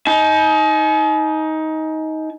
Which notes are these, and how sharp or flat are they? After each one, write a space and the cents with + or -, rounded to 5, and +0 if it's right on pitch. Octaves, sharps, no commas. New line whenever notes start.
D#4 +20 G#5 +45